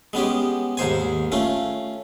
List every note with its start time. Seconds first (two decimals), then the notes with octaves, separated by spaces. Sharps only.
0.13 G#3 B3 C#4 G4
0.77 D#2 G#2 C5 G#5
1.32 A3 C#4 F4